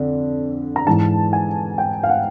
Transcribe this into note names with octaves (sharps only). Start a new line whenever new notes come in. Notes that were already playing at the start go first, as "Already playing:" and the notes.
Already playing: F2 D3
A#5
G#2 E3 A5
G#5
G5
F5
F#5